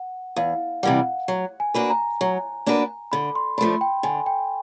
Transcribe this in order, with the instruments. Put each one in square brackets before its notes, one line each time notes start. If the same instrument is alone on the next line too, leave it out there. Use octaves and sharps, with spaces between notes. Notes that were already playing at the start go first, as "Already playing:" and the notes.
Already playing: [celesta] F#5
[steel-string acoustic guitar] E2 [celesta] F5
[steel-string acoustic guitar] C3 E3 G3 [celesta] F#5
[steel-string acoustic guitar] F#3
[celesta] G#5
[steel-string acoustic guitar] A#3 D4 F#4 B4
[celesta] A#5
[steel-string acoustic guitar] F#3
A#3 D4 F#4 B4
[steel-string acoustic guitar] D3 [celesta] B5
[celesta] C6
[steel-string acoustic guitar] F3 A3 D4 [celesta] B5
[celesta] G5
[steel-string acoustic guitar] D3 [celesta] G#5
[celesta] G5